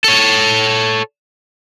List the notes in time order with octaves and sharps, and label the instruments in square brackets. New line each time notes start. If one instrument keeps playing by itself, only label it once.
[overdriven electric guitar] A4 C#5